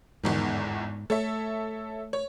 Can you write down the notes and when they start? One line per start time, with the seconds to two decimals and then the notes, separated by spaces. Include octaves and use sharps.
0.23 G1 E2 G#2 D#3
1.10 A3 A4 C#5 E5
2.13 C#5